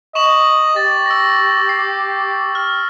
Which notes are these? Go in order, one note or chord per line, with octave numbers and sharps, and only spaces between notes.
D#5 C#6 E7 F#7
G4 A6
E6 A#6
C7
F6